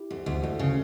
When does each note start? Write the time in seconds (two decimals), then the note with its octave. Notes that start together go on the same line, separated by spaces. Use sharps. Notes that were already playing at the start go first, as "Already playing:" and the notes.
Already playing: E4 G4
0.11 D2
0.26 D2
0.43 D2 F#4 A4
0.59 C#3